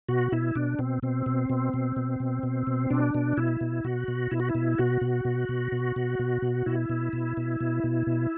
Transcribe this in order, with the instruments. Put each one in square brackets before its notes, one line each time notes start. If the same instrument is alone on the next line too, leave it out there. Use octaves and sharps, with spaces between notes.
[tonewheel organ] B2 F#4
B2 E4
B2 D4
B2 C4
B2 C4
B2
B2
B2
B2
B2
B2
B2
B2 D4
B2
B2 E4
B2
B2 F#4
B2
B2 E4
F#4
E4
B2
B2 F#4
B2
B2
B2
B2
B2
B2
B2
B2 E4
B2
B2
B2
B2
B2
B2